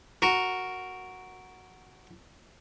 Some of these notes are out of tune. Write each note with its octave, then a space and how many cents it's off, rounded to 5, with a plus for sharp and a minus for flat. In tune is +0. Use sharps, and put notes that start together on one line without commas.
F#4 +0 A#4 +0